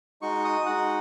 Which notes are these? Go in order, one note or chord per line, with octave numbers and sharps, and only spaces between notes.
G#3 D#4 F#4 C#6
D#6
G#3 D#4 F#4 F#5